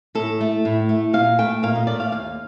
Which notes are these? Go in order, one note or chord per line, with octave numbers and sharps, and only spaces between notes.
A2 A4
A3
A2
A3
A#2 F5
A3 G5
A#2 F5
D#5
A3 D5
F5
D#2 F5